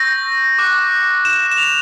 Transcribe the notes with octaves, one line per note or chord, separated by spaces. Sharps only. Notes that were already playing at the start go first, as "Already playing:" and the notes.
Already playing: C#6 E6 G6 A#6
D6 F#6
E7
E7
F7